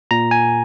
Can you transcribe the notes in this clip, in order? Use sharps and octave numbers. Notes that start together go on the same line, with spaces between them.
A#2 A#5
G#5